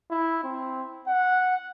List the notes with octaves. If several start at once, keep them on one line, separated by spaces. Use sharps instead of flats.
E4
C4
F#5